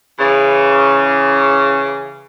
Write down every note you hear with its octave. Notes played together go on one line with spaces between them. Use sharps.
C#3 E3